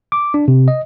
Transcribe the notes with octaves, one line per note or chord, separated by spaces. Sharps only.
D6
D4
C3
D#5